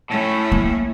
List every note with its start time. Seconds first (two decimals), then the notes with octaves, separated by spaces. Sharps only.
0.11 A2 A3 C#4
0.52 A#3